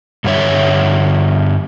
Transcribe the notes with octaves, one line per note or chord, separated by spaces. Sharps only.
G2 D3 G3 C#5 E5